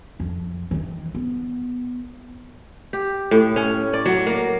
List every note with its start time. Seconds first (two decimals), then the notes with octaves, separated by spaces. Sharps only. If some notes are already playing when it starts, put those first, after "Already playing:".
0.20 F2
0.71 D#3 E3
1.15 B3
2.93 G4
3.31 A2
3.56 C#4
3.93 D5
4.06 F#3
4.27 A#3